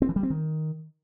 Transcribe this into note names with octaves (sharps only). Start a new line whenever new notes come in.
C4
E3
G3
C4
D#3